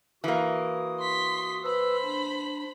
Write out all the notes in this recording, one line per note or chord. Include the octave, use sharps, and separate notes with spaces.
E3 A#3 F#4 D#6
C6 B6
B4 C5 B5 E6
D4